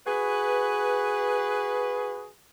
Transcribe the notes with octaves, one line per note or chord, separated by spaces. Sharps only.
F#4 G#4 B4